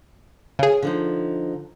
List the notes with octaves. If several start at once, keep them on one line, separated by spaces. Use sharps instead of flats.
C#3 G#4
D3 F3 D#4